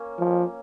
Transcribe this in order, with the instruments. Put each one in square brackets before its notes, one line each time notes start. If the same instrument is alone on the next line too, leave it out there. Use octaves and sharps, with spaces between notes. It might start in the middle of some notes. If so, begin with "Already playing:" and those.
Already playing: [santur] A#3 C#4
[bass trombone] F3